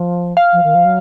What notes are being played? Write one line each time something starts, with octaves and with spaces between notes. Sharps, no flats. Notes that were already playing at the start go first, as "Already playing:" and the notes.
Already playing: F3
F5
F3
D#3
F3
F#3